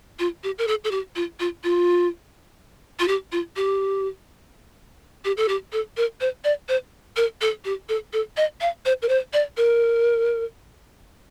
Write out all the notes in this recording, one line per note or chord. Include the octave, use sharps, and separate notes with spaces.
F4
G4
A#4
A4
A4
G4
F4
F4
F4
F4
G4
F4
G4
G4
A4
G4
A4
A#4
C5
D5
C5
A#4
A4
G4
A4
A4
D#5
F5
C5
A#4
C5
D5
A#4